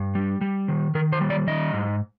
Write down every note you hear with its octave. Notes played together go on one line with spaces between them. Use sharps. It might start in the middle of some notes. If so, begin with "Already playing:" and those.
Already playing: G2
G3
G3
D#3
D#3 A#4
C5
G3
D5
D#3 D#5
G#2